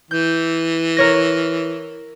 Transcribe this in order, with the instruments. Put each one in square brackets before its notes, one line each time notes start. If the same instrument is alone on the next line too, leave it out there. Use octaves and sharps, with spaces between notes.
[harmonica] E3 [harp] G6
[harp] A#4 C#5 A#6